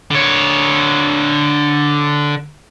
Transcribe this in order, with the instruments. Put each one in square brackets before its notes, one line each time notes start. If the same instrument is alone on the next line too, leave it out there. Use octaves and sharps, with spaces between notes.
[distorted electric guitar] D3 C#5